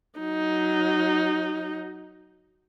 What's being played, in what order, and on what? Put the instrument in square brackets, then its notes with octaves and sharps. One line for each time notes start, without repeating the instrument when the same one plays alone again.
[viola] F#3 D#4